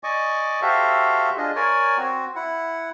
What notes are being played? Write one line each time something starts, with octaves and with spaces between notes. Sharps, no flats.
D5 D#5 G#5 C#6 D6
F#4 G4 A4 C5 E5 F5
D4 F4 G#4 D#5
A#4 C#5 D5 G#5
C4 F#4
E4 F#5